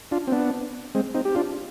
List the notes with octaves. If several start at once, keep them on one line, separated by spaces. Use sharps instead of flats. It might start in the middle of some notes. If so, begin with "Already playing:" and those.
D4 F4
C4
B3 D4
G#3 C4
C4 D#4
G4
D4 F4